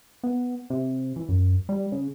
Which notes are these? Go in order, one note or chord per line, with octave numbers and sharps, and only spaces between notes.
B3
C3
E3
F#2
G3
C#3